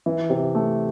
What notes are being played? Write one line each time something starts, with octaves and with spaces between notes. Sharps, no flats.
E3
C3
A3